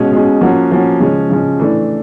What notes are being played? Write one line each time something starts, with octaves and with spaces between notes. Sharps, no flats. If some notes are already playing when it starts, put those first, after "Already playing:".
Already playing: B2 G#3 C#4
B2 G#3 C#4
F3 A#3 C#4 F#4
F3 A#3 C#4 F#4
C#3 F3 G#3 C#4
C#3 F3 G#3 C#4
E3 A3 D4